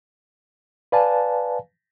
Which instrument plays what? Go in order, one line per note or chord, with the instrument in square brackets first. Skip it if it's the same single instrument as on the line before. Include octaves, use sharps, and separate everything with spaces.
[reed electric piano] B4 D5 F5 G#5 A5